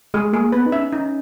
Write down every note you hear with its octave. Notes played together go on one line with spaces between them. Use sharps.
G#3 G#4
A#3 G#4
B3 B4
D#4
C#4 E5
D#4